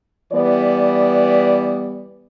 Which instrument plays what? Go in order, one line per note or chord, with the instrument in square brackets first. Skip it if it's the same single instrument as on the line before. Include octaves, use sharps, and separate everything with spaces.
[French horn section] E3 G3 B3 D5